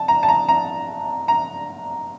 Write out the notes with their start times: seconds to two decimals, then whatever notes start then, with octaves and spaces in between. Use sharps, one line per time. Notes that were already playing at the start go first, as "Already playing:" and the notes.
Already playing: A5
0.08 A#5
0.23 A5
0.28 A#5
0.48 A#5
1.28 A#5